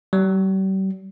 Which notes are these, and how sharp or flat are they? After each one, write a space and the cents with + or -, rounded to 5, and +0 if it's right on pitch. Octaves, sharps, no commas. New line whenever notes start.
G3 -40